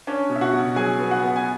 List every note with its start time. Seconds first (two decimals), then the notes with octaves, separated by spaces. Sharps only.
0.07 C#4 D4 C#5
0.30 B2
0.35 E5
0.41 F#4 F#5
0.53 B2
0.76 F#3 G#4 G#5
0.99 B3
1.10 F#4 F#5
1.22 B3
1.36 G#5